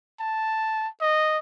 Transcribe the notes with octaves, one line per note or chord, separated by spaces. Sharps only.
A5
D#5